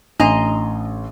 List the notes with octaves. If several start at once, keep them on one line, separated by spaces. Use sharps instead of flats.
A1 D4 D#5 A#5 C6